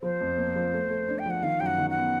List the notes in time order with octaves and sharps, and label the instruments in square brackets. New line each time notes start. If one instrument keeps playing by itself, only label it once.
[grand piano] F3 [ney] C5
[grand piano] F2
A#3
F3
A3
A3
D4
[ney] G5
[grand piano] F3 [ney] F#5
[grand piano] D#3 [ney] F5
[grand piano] F#2 [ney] G5
[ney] F#5
[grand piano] D#3
[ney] F#5
[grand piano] B3